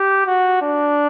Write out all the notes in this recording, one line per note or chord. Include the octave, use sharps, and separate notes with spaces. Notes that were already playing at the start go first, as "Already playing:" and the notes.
Already playing: G4
F#4
D4